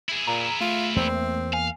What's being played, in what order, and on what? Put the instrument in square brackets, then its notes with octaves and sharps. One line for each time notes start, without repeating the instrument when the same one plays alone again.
[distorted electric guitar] E4 G#4
[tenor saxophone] A#2 [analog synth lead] A#5
[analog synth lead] A3 [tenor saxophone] F4
[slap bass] E2 A#3 [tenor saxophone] C4
[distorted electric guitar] F5 [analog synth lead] G#5